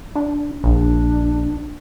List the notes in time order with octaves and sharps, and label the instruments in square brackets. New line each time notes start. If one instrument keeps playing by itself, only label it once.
[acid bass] D4
[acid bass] A#1 [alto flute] D4